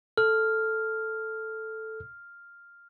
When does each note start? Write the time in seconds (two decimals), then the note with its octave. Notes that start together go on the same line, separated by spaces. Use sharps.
0.17 A4 F6